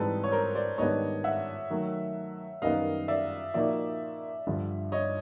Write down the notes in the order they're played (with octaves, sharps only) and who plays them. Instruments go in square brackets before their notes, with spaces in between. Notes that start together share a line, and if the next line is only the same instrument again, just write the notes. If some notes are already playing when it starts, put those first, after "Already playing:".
Already playing: [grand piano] G#2 E3 G3 C4 D#4 [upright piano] A4 B4
[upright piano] C#5
A#4 C5
C5 D5
[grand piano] G#2 D#3 G3 B3 D4 [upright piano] C#5 D#5
[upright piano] E5 F#5
[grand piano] D#3 F#3 A3
[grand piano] F#2 D#3 G3 B3 D#4 [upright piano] D#5 F5
[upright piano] D5 E5
[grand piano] A#2 F3 A#3 D#4 F#4 [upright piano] D5 E5
[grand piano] G2 D3 F3
[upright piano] C#5 D#5